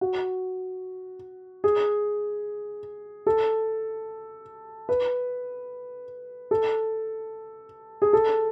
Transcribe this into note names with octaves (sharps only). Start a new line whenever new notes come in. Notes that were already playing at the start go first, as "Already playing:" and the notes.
F#4
G#4
A4
B4
A4
G#4
A4